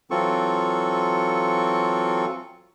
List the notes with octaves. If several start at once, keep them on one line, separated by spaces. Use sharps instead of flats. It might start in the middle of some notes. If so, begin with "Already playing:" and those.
E3 F#3 C4 F4 A4 C#6